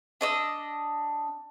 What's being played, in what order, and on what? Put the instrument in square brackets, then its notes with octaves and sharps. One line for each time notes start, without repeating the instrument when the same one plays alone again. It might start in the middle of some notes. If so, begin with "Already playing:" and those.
[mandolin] D4 D#5 E6